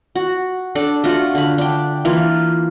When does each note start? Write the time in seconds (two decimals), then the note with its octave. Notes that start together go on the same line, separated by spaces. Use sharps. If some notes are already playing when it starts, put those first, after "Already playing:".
0.15 F#4
0.75 D4 A4 D5
1.04 A3 F4 F#4
1.35 D3 B5
1.58 D4 G5
2.05 E3 A#3 F4